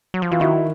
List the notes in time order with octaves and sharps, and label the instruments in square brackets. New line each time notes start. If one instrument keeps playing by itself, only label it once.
[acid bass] F#3
F3
[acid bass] E3 [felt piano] F4
[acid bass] D#3 [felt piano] E4 F#4